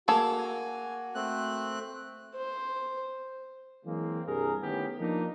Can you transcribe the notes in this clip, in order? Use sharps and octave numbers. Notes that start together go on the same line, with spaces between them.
A#3 F#4 G#4 A4
G#5
A3 C4 F#6
C5
E3 F#3 G#3 A#3 C4
C2 G2 G#4 A#4
D#3 A3 B3 C#4 E4 G4
F3 A#3 D4 D#4